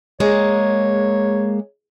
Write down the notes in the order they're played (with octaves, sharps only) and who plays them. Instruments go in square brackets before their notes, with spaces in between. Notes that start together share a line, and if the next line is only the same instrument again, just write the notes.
[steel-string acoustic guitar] G#3 A#3 [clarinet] C#5